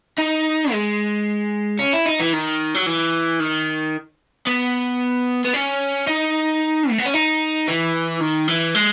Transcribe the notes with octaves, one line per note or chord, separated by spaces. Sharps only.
D#4
G#3
C#4
E4
D#4
E3
D#3
F#3
E3
D#3
B3
B3
C#4
D#4
A3
B3
C#4
D#4
E3
D#3
E3
G#3